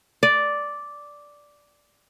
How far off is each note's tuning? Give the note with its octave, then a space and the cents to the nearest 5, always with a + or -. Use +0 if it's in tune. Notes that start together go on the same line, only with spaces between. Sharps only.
D5 -5